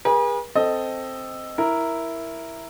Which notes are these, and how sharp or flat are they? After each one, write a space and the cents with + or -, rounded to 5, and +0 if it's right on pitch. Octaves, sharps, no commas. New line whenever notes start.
G#4 -30 B4 -45
C4 +0 A4 +5 D#5 +0
E4 +0 A#4 +0